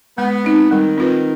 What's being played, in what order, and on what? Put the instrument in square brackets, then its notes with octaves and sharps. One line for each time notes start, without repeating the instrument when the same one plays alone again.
[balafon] G#3 [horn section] B3
[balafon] C4 D#4
[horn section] D#3 [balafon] G3
[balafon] C4 F4 B4